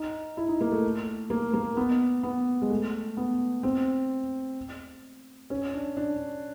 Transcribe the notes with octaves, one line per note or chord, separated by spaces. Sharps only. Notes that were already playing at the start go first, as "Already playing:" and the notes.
Already playing: D#4
E4
D#4
A#3
A3
A#3
A#3
B3
B3
G#3
A3
B3
C4
C#4
D4
D4